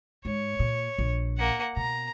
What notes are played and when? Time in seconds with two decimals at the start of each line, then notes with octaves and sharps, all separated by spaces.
0.25 G#2 C#5
0.59 A#2
0.98 A#1
1.37 A#3 F#5
1.76 B2 A#5